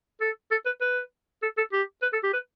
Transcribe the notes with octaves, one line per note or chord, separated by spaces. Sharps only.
A4
A4
B4
B4
A4
A4
G4
B4
A4
G4
B4